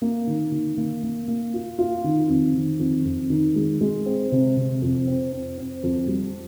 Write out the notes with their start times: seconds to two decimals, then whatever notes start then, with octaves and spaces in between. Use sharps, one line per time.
0.02 A#3
0.27 D#3
0.52 D#3
0.77 A#3
1.03 A#3
1.28 A#3
1.54 F4
1.79 F4
2.04 D#3
2.29 F2
2.54 D#3
2.79 F2
3.05 F2
3.30 D#3
3.56 G#3
3.81 G#3
4.06 C4
4.32 C3
4.56 C3
4.82 F2
5.07 C4
5.32 C4
5.58 C4
5.83 F2
6.08 G3